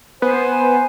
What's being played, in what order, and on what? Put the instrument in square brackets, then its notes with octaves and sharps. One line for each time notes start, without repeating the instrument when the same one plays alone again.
[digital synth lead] B3 [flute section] C5 G#5